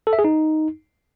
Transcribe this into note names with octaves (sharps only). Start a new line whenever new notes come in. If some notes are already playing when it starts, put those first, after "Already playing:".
A4
E5
G#4
D#4